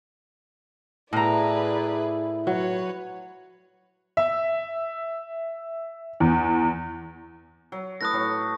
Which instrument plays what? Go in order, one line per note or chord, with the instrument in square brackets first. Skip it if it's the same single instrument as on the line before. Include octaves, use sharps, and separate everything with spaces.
[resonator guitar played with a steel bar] A2 A#5 [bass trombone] E4 [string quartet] G#4 B4 D5
[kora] F#3 [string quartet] B4 C#5
[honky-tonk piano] E5
E2
[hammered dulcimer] F#3
[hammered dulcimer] A3 E4 B4 [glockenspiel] D#6 F#6 A#6
[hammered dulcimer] A2 F#3 C#5